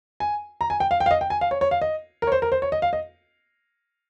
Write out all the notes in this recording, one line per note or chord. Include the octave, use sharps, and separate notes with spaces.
G#5
A#5
G#5
G5
F5
G5
F5
D#5
G5
G#5
F5
C#5
C#5
F5
D#5
A#4
C#5
C5
A#4
C5
C#5
D#5
F5
D#5